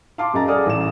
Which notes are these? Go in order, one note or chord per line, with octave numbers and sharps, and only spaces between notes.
F5 A5 C6 D6
F#2 G#4 D#5 A#5 A6
G#4 A4 D5 F#5 D#6 F6
A1 E7